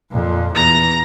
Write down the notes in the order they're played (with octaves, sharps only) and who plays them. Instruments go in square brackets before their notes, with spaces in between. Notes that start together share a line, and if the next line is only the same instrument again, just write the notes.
[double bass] F2 A#2
[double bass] E2 [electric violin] A#5 A#6